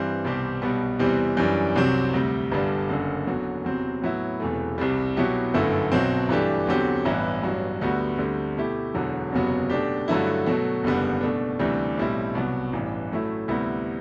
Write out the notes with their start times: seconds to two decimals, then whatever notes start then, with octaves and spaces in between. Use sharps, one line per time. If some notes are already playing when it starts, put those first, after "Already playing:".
Already playing: G2 E3 G3 C4
0.25 C2 B2 G3 C4 G4
0.62 B1 B2 G3 B3
0.99 E2 C3 E3 G3 C4
1.37 F#2 E3 G3 D4
1.76 C2 C3 F#3 C4
2.14 D2 C3 G3
2.51 G1 G2 D3 G3 D4
2.89 F#1 F#2 D3
3.27 E2 D3 F#3
3.64 E2 C3 F#3 C4
4.02 A2 F#3 B3 E4
4.40 E1 E2 C3 E3 A3
4.78 C2 C3 G3
5.17 B2 F#3 B3 E4 G4
5.54 G1 F#2 D3 A3 E4
5.92 B1 B2 F#3 C4
6.29 G2 E3 A3 D4 G4
6.67 E2 D3 F#3 C4 G4
7.05 A1 G2 E3 B3 E4
7.43 A1 G2 F#3
7.81 D2 D3 G3 B3 F#4
8.18 D2 D3 G3 C4
8.57 B2 A3 E4 G4
8.94 E1 E2 D3 F#3
9.32 F#1 E2 C3 F#3 B3
9.70 B2 A3 D4 G4
10.08 G2 D3 F#3 A3 E4
10.46 B2 F#3 A3
10.84 F#1 E2 D3 G3 B3
11.21 B2 A3 D4
11.59 D2 C3 E3 G3 D4
11.97 B1 A2 G3 C4 E4
12.35 C2 B2 F#3 B3
12.73 A1 G2 E3
13.11 A2 F#3 A3 E4
13.48 D2 C3 G3 B3 E4